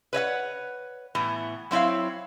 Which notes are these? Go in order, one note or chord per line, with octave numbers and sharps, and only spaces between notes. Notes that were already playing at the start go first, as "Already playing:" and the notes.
B4 C#5 D#5 F#5
A2 E3 B3
F#3 C4 E4 C#5 F5